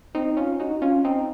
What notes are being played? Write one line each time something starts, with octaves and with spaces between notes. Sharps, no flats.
C4 D#4
C#4 F4
D#4 F#4
C#4 F4
C4 D#4